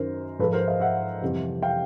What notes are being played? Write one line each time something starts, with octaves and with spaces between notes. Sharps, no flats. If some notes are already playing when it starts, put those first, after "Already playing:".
Already playing: F#2 D#3 F#3 A#4 C5
G#2 F3 G#3 A4 B4
A#4 C5
D#5 F5
E5 F#5
F2 C3 E3 G3
F5 G5